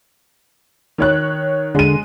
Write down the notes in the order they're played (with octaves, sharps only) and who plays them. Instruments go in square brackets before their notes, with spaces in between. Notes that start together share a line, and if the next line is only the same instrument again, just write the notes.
[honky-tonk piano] D#3 C#5 F#6
[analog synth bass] D3 [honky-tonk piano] G#3 D#7